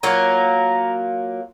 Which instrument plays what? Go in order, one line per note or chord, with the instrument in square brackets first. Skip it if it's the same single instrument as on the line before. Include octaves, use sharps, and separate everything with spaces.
[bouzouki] F#3 A#3 F4 [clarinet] A#5